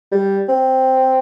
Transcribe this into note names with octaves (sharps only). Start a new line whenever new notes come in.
G3
C4